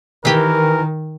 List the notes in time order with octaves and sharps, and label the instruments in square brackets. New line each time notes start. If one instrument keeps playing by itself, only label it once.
[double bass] D#3 [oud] E3 G4 [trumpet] A#4